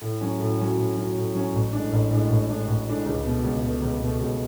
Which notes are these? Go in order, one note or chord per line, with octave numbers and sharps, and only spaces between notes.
A2
F#3 C#4 F#4
A2
F#3 C#4 F#4
A2
F#3 C#4 F#4
A2
F#3 C#4 F#4
A1
A2 G#3 D4
A1
A2 G#3 D4
A1
A2 G#3 D4
A1
A2 G#3 D4
C#2
B2 A3
C#2
B2 A3
C#2
B2 A3
C#2